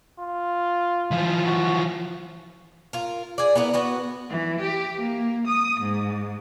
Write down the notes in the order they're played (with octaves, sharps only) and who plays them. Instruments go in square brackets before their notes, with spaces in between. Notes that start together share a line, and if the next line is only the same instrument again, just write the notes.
[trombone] F4
[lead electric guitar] E3 F3
[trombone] F#4
[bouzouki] F4 A#4
G#4 D5
B3 E4 A#4 B4
B3 F#4 B4
[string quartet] E3
G4
A#3
D#6
G#2